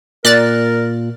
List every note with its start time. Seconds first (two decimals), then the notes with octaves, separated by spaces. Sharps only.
0.25 A#2 A#4 D5 F#6 A6